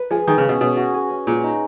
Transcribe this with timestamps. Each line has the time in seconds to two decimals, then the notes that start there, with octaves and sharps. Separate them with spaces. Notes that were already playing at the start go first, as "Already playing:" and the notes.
Already playing: B4
0.11 F3 G#4
0.28 D#3 G#4
0.38 C#3
0.44 C#4
0.49 B2
0.60 B2 C#5
0.77 F#4
0.94 G#4
1.10 C#4
1.27 A#2 G#4
1.44 D#4